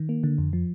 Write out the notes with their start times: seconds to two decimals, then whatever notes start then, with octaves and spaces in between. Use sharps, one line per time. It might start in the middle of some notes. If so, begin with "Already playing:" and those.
Already playing: D#3
0.09 A#3
0.24 D3
0.38 F2
0.53 F3